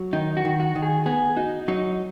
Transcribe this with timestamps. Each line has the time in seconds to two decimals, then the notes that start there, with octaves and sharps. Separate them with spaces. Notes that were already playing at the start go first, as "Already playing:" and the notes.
Already playing: F#3
0.13 D#3 D#4
0.37 F#4
0.45 D#3
0.60 F#4
0.75 D#3
0.82 G#4
1.06 B3 G#4
1.36 D#4 F#4
1.68 F#3 D#4